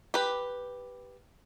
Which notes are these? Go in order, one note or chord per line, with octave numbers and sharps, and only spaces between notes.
G4 B4